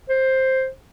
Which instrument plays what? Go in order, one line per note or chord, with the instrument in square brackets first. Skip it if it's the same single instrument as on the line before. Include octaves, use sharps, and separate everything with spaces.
[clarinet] C5